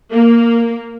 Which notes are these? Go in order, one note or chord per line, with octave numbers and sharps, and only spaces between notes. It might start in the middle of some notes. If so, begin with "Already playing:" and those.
A#3